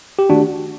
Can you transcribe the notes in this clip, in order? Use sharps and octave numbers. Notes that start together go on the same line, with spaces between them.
G4
D#3 A3 D4 F#4